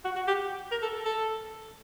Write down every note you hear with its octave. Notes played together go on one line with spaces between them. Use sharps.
F#4
F#4
G4
A#4
A4
A4
A4